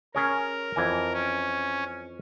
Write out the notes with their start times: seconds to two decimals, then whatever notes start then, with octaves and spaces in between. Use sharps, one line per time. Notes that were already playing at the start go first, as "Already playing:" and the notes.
0.15 C#4 G#4 A#4 C#5
0.76 F2 E3 G#5
1.13 C#4